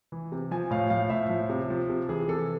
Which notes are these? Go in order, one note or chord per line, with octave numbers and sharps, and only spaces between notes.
E3
C3
F3 G#5
A2 F5
F3 F5
A2 E5
F3
C3
F3
C3
E3 G#4
C3 A4